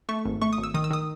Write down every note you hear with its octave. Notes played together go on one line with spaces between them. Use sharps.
A3 C#6
G#1
A3 C#6
D#6
G#1
E6
D#3 D#6
E6
D#3 D#6